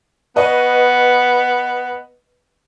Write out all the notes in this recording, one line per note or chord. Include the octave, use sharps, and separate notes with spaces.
B3 B4 D#5 C#6